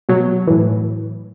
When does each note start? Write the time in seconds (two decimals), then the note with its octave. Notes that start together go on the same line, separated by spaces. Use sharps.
0.09 B2 F#3
0.47 A2 E3